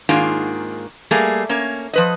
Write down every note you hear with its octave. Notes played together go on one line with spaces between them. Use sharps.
G#2 D#3 A#3 D4 F4 G#4
G3 A3 A#3 G#4
A#3 C#4
F3 B4 D#5